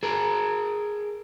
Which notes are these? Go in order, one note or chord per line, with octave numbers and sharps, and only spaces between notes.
G#4 A#4